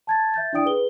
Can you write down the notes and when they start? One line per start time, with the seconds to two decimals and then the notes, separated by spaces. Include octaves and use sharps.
0.07 A5 G#6 A6
0.34 E5 G6 A6
0.53 D4 E4 D5 G5 D#6 D7
0.65 G#4 B4 G7